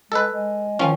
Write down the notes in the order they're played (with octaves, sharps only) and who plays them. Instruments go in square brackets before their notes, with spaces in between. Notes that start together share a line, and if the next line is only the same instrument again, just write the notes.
[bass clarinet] G#3 [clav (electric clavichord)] A4 B4
[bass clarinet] G#3
[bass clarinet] D#3 [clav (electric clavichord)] F3 C#4